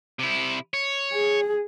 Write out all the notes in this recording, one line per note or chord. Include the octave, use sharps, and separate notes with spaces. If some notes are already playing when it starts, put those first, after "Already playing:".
C3 E4
C#5
G#4